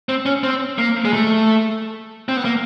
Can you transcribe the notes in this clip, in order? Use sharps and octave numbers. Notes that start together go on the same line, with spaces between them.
C4
C#4
C4
A#3
G#3
A3
C4
B3
A#3